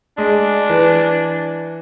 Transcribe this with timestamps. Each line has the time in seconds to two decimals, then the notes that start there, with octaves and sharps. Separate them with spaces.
0.17 G#3 D4
0.69 E3